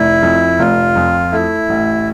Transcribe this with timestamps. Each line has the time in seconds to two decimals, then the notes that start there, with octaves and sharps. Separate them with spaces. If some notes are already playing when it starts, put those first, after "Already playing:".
Already playing: F1 E4
0.22 F2
0.59 F1 F4
0.95 F2
1.32 A3 E4
1.69 A1